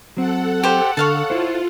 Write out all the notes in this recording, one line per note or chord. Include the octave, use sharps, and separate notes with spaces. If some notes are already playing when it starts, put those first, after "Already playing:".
F#3 C4 A4 F#5
G4 C5
D3 C#5 F5 A5
E4 F4 C5